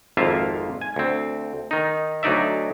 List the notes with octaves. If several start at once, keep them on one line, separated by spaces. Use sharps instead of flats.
G#1 F2 A#3 F4 E5 F5
G#5
D2 C4
D#3 D#4
D2 F#3 D#4 D5 E5